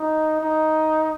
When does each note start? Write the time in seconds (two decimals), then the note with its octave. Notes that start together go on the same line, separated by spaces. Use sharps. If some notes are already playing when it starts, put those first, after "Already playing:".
Already playing: D#4
0.41 D#4